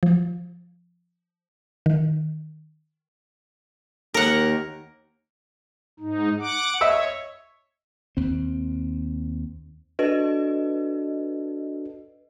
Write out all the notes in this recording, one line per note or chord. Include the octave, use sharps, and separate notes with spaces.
F3
D#3
D#2 A#4 F#5
G#2 D#4
F#5 D6
C#5 D#5 E5 E6
D#2 C4
D4 F#4 A4 B4 D#5